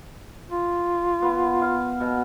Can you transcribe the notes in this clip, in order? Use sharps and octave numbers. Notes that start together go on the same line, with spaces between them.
F4
B3
F5
B2